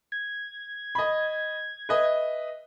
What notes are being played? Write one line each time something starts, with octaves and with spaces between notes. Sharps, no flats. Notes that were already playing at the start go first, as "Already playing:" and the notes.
G#6
D#5 B5
B4 D#5 E5